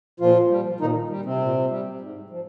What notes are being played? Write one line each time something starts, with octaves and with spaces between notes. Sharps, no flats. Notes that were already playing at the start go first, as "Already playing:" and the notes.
A#2 F3 F4
G3
A#2 D#3 D#4
G3
C3 C4
A#2
G3
G#2
F3